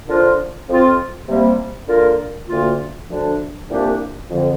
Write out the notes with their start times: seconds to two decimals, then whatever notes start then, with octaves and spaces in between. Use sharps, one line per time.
0.07 D3 F3 D4 F4 A#4
0.67 F2 F3 C4 F4
1.28 C3 G3 A#3
1.88 D3 A#3 F4 A#4
2.48 D2 D3 A#3 F4
3.08 D2 D3 F3 D4
3.68 C2 A#2 A#3 D4 G4
4.29 F2 D3 F3